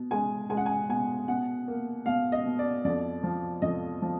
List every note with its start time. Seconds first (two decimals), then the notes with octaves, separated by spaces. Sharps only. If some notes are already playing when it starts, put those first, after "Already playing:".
Already playing: B2
0.11 G#3 G#5
0.50 G#3 G#5
0.57 F#5
0.66 G#5
0.89 B2 G#5
1.28 B2 F#5
1.68 A#3
2.06 B2 F5
2.32 D#5
2.46 B2
2.59 D5
2.84 F2 D5
3.23 F3
3.62 F2 D#5
4.02 F3